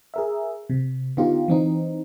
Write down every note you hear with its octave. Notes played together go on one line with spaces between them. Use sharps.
G#4 A#4 E5
C3
D3 B3 D#4 F4 G4
E3 C4 D#4